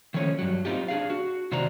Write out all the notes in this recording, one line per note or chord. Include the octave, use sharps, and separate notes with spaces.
D#3 F3 A3 C#4 C#5
G2 F#3
C4 D#4 F4 G4
D4 G#4 F5
F#4
C3 D#3 F#4 C5 D5 A#5